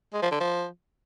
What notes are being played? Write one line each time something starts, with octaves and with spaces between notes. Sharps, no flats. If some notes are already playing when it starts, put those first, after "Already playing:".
G#3
F3
D3
F3